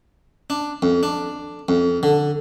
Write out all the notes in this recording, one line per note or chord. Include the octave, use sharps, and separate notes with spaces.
D4
F2
D4
F2
D3